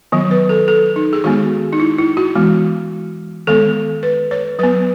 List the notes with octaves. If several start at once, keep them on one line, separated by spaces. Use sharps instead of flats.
D#3 F#3 B3
B4
A4
A4
D#4
G#4
D#3 G#3 B3 F#4
D#4
E4
E4
F#4
E3 G#3 B3
D#3 G#3 B3 A4
B4
C#5
F#3 B3 B4